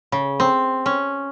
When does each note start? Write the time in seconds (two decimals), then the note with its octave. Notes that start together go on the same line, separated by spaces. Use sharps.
0.12 C#3
0.40 C4
0.86 C#4